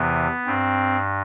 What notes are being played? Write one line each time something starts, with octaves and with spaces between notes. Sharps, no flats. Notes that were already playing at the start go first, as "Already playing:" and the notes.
Already playing: E2 C3 E3 B3
G2 C4